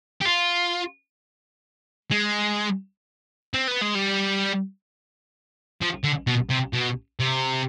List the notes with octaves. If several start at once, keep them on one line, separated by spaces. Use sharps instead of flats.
G4
F4
G#3
C4
B3
G#3
G3
F3
D3
B2
C3
B2
C3